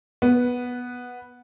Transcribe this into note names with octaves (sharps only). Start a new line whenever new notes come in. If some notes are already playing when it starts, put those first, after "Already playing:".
B3